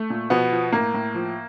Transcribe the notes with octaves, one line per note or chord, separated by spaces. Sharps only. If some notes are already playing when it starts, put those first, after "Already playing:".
Already playing: A3
A#2
B2 F3 B3
F3
A2 A#3
A2
F3